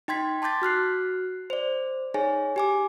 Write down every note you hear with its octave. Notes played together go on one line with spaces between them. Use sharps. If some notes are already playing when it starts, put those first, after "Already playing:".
D#4 G5 C6 G#6 B6
A5 C6 D6 G6 A6 B6
F#4 F6 F#6 C7
C5 D5
D#4 G#4 C#5 G#5
G4 G#5 D6